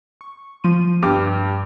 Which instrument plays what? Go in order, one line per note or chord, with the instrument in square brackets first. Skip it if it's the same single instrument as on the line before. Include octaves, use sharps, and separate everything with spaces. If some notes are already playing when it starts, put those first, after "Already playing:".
[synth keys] C#6
F3 C6 D#7
[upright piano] G2 G4 D6 [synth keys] F6